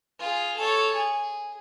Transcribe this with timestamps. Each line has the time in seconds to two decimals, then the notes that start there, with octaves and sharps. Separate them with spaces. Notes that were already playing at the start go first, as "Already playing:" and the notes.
0.19 F4 G#4
0.56 A4 C#5
0.95 G#4